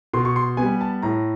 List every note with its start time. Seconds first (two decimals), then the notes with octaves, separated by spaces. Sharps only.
0.13 B2 C6
0.25 C#6
0.36 C6
0.57 G3 B3 G#5
0.81 A5
1.02 A2 A#5